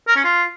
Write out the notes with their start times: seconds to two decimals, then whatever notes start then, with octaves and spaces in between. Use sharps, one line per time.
0.08 A#4
0.16 C#4
0.24 F4